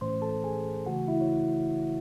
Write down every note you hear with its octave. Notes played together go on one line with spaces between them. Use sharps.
A2 E3 A3 C#4 C5 C6
A4 A5
G#4 G#5
C#3 E3 A3 F#4 F#5
E4 E5
C#5